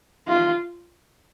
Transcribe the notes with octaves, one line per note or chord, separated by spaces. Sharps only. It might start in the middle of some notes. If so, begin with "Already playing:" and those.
F4